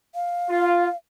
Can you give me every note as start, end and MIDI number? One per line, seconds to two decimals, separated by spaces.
0.15 0.96 77
0.49 0.87 65